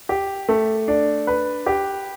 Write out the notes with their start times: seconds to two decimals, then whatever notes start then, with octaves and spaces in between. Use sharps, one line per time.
0.09 G4
0.49 A3
0.88 D4
1.27 B4
1.66 G4